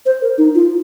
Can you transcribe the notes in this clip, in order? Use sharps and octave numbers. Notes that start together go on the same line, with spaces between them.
C5
A#4
D#4
F4